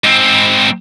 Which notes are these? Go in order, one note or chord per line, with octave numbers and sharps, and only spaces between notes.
G#2 C4